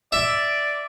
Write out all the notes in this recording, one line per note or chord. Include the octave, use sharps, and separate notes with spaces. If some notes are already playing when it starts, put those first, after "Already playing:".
D5 E5